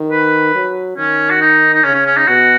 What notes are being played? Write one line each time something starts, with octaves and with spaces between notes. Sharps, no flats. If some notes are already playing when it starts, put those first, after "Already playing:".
Already playing: D#3
B4
F#3
D#3 C#4
F#4
D#4
D#4
C#3 C#4
C#4
C#4
D#4
B2 F#4